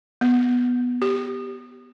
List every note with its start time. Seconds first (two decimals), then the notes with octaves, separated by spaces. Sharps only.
0.21 B3
1.02 G4